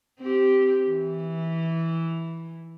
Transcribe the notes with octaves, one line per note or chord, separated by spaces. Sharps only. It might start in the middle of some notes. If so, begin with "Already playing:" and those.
C4 G4
E3